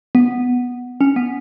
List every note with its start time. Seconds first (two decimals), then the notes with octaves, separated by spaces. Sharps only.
0.15 B3
1.01 C#4
1.16 B3